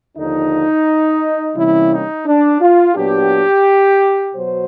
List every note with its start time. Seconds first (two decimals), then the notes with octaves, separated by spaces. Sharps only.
0.17 D#2 D3 F3 D#4
1.56 C3 E3 G3 A#3 C#4 E4
1.91 D#4
2.26 D4
2.61 F4
2.95 A#2 F#3 B3 D4 G4
4.35 B2 F#3 C5